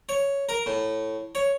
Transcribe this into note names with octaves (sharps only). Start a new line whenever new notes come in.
C#5
A#4
A2
C#5